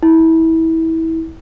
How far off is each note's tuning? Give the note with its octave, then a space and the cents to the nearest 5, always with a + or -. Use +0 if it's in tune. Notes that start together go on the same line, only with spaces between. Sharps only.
E4 -25